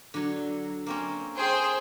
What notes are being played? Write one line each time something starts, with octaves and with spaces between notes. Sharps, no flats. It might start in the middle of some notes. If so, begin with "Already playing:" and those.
D3 F#3
A#3 C4 C#4
G#4 C5 G5